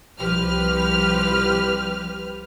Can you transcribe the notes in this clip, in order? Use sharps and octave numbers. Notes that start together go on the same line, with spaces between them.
C2 F3 G4 B4 F6